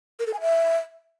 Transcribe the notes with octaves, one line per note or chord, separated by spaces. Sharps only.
A#4
A4
G#5
E5